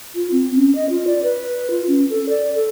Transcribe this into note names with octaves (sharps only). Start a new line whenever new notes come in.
F4
C4
C#4
D#5
F4
D5
B4
F4
C#4
A4
D5
A4